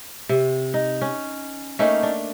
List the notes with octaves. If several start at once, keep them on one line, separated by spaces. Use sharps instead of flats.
C3
D#4
C#4
A3 A#3 C#4 D#4
D4